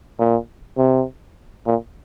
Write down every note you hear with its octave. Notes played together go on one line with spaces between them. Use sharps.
A#2
C3
A#2